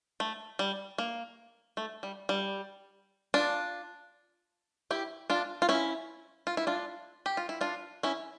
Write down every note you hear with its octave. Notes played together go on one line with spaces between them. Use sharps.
A3
G3
A#3
A3
G3
G3
D4 F4
E4 G4
D4 F4
F4
C#4 E4
F4
E4
D4 F4
G4
F4
E4
D4 F4
C#4 E4